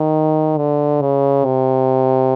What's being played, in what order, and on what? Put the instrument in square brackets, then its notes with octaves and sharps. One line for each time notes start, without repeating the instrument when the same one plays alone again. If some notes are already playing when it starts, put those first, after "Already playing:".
Already playing: [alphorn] D#3
D3
C#3
C3